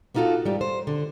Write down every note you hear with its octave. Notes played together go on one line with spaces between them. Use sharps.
A#3 B3 D#4 F4 F#4 A4
G#2 G3
C5
D3